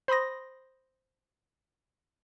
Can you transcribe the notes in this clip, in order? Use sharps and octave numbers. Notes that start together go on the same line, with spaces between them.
C5 B5 C6 D#6 A#6